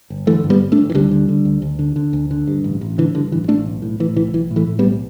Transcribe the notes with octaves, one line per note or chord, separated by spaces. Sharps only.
G1
D3 E3 A3
G2
G3 B3
G1
A3 D4
G1
E3
D2 D3 G3
D3
D3
D2
D2
D3
D3
D2
D3
G2
A1
A1
D3 E3
G2 D3
A1 E3
A1 A3 D4
B1
A2
A2 E3
B1 E3
B1 E3
A2
E3 A3
A2
G3 B3
B1